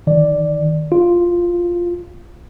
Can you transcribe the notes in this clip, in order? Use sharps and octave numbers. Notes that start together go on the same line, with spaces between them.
D#3 D5
F4